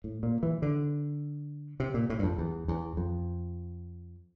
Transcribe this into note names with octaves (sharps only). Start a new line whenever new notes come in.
A2
A#2
E3
D3
C3
A#2
A2
G2
F2
E2
E2
F2